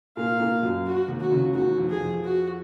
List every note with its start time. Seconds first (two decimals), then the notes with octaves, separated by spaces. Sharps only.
0.17 A#2 A#3 F5
0.40 A#2 A#3
0.62 F#2 F#3
0.86 F#4
1.08 D#2 D#3
1.20 D#3 F#4
1.31 C#2 C#3
1.54 D#2 D#3 F#4
1.78 F2 F3
1.90 G#4
2.00 F2 F3
2.24 F#4